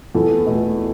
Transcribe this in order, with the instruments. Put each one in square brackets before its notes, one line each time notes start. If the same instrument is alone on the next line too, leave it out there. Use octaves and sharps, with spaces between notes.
[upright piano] E2 A4
B2 A3